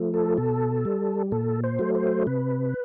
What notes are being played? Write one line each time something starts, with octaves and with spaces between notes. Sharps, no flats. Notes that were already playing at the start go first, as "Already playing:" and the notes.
Already playing: F3 A3
A4
B2 A4
G3
A#2 A4
C5
F#3 A3
C5
C3 B4